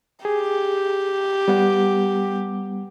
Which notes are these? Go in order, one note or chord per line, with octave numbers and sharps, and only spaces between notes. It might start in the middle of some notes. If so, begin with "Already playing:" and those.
G4 G#4
G3 B3 F#5